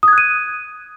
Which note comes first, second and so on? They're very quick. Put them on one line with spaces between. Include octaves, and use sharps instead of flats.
D#6 G#6 F#6 D#7